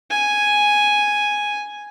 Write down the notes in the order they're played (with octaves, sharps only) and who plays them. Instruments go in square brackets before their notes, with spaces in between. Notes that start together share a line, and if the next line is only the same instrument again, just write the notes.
[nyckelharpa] G#5